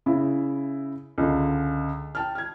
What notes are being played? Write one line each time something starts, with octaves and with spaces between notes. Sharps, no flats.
C#3 E4
C#2 D3
G5 A5 F6
F6 G#6